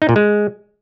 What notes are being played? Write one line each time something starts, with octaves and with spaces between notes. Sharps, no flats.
D#4
A#2
G#3